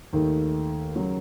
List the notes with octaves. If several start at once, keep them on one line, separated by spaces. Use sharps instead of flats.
D#2 D#3 A3
C#3 F#3